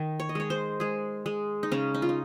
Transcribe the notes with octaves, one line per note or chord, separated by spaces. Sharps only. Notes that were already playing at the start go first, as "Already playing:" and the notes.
Already playing: D#3
C#5
D#5
G#3 C#5
C5
G#3 G#4
G#3
D#4
C#3 C#4
D#4
F4
D#4